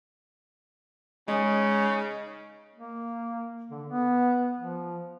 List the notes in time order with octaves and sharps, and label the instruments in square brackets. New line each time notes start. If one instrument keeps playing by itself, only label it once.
[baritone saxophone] C#3 [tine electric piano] G#3 [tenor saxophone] D#4
[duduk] A#3
D3
B3
F3